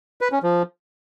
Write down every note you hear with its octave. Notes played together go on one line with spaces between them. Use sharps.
B4
C#4
F3